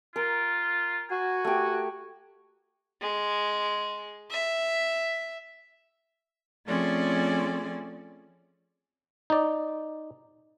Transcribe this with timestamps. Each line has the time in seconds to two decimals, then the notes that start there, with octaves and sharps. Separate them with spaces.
0.16 F4 A#4
1.11 F#4 G#5
1.44 A3 G4
3.01 G#3
4.31 E5
6.66 F3 A3 C4 C#4 G#4 D5
9.30 D#4 D5